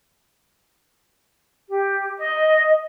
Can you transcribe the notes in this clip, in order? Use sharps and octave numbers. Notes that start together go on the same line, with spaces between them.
G4
D#5